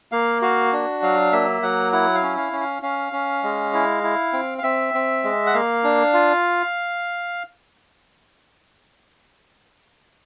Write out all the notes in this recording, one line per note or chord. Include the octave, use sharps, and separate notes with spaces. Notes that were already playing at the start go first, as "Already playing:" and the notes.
A#3 F5
F#4 F5
D4
F#3 F5
A#3 E5
F#3 F#5
E4 F#5
F5
C#4
F5
C#4
F5
C#4 F5
C#4
G#3
E4
E4
C4
F5
C4 E5
C4
G#3
F#5
A#3 F5
D4
F4